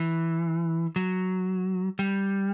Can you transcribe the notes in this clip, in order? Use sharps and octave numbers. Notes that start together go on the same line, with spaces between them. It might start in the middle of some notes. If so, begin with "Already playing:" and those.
Already playing: E3
F#3
G3